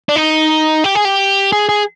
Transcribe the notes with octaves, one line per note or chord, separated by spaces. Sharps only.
D4
D#4
G4
G#4
G4
G#4
G#4